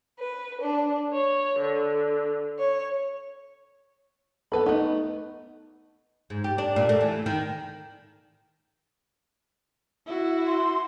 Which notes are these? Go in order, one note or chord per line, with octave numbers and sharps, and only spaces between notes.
B4
D4
C#5
D3
C#5
B3 A4 B4 B5
A3 B3 D#4
G#2
G4
D4
A#2
A3
E3
D#3
E4 F#4
C6